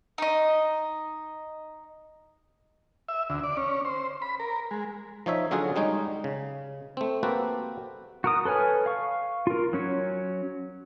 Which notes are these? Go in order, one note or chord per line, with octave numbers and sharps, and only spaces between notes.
D#4 D#5
E5
D2
D5
C#4
C5
B5
A#4
G#3
F3 D#4 C#5 E5
D3 F#3 C#4 F4 F#4 G#4
G3 G#3 D#4 C#5
C#3
A3 C4
A#3 C4 F#4 G4 A4 B4
F#4 A#4 D#6
A4 B4 C#5 G#5 F6
F5 C#6
F4 A#4
F#3 C#4 C#5